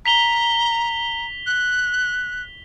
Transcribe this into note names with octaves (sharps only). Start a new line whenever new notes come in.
A#5 B6 F7 G7
F#6